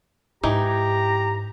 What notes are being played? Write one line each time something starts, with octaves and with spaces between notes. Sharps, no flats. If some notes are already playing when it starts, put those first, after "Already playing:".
G#2 E3 D#4 G4 A#5